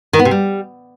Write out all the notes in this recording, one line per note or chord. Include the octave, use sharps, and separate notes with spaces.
D#3
B3
C3
G3